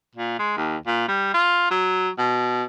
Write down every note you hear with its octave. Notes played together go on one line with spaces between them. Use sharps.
A#2
G#3
D#2
A#2
G3
F4
F#3
B2